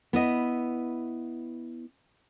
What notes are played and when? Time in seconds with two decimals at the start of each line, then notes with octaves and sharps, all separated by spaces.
0.13 B3 E4 D#5